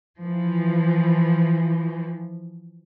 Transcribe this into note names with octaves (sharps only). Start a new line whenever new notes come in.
E3 F3